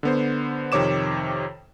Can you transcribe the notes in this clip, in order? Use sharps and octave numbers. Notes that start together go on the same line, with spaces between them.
D3 B3 C5
F2 C3 D#3 C#5 D6 E7